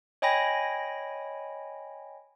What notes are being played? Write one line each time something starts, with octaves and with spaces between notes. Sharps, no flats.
C#5 D#5 G5 G#5 B5 A#6